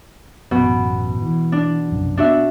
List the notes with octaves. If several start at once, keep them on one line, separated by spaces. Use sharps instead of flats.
A1 F#2 B2
E3
D4
F1 B1 F#2
A#3 B3 D4 F#4 E5